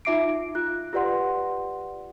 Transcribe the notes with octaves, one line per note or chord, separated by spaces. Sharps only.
D#4 F4 E5 D6 C7 D7
F4 F#6
F4 G4 B4 D5 F#5 C6